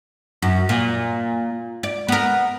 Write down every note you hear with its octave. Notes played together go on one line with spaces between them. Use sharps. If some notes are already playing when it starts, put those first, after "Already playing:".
F#2
A#2
D5
B3 A#4